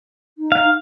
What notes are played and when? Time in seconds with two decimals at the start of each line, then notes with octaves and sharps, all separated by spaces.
0.38 D#4
0.52 F5